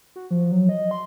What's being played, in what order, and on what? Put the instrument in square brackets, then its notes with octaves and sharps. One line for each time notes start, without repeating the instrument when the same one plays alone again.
[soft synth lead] F#4
F3
F#3
D#5
C6